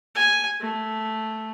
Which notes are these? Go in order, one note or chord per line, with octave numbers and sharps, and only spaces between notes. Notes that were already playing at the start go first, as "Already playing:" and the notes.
G#5
A3